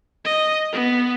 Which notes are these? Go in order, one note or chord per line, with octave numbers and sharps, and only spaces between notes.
D#5
B3